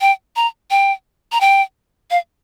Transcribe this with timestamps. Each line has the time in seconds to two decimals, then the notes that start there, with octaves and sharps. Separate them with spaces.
0.01 G5
0.36 A#5
0.71 G5
1.32 A#5
1.41 G5
2.11 F5